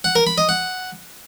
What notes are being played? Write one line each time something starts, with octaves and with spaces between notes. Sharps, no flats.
F#5
A#4
B5
D#5
F#5